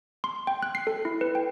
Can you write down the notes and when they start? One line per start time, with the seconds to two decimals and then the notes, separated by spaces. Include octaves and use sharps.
0.24 C6
0.47 G5
0.63 F#6
0.75 C7
0.87 A4
1.05 E4
1.21 B4
1.35 G5